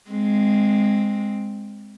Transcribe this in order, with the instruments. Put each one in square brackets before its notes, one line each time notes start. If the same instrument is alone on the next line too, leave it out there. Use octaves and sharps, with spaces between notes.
[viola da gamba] G#3 C4